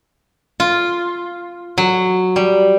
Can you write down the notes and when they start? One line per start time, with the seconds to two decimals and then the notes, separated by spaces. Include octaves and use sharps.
0.60 F4
1.78 F#3
2.36 G3